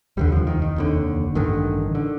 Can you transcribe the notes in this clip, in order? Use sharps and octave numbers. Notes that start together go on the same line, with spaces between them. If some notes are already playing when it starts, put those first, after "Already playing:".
F1 D#2 D3 G3
F3
D#3
D#3
F1 D#2 D3
A1 G2 D3 D#3
D3